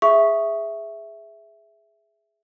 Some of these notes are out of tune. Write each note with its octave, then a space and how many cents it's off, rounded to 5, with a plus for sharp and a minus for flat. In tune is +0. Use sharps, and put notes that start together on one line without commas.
G#4 +0 E5 +0 C#6 +0